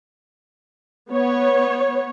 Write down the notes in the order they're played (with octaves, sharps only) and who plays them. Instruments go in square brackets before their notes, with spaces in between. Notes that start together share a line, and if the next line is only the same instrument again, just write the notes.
[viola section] B3 C#5